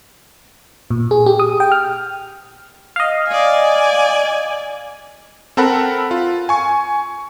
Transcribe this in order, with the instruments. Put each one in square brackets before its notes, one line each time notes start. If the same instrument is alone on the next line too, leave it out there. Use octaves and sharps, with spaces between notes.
[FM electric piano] A#2
G#4
G4
D#6
G5
F6
D#5 F5
[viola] D5 G#5
[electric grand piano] C4 A4 A#4 F#5 B5 F#6
F4
G#5 C#6